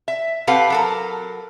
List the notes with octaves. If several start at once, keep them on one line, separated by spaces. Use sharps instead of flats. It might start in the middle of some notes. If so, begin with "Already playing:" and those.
E5
C4 G4 A4 B4 F5 F#5
F#3 A4 A#4